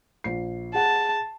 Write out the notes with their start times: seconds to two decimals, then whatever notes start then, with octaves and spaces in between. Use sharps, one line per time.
0.24 A#1 C7
0.75 G#4 F#5 A5